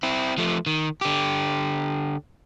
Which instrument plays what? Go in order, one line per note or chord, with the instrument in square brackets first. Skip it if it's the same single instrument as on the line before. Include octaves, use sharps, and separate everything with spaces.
[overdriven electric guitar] C4 E4
F3 A3
D#3
D3 G4